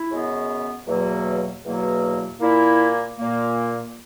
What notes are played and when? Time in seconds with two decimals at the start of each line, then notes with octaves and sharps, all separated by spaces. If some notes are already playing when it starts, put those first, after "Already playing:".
Already playing: E4
0.10 F#2 C#3 G#3 B3
0.87 E2 B2 F#3 A#3
1.64 E2 B2 F#3 A#3
2.40 A#2 A#3 E4
3.18 A#2 A#3